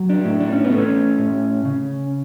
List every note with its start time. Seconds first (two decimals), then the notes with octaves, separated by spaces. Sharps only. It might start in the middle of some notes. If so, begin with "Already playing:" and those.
Already playing: F#3
0.09 D4
0.25 A2
0.40 D4
0.52 C#4
0.64 B3
0.72 A3
0.78 C#4
1.19 A2
1.65 C#3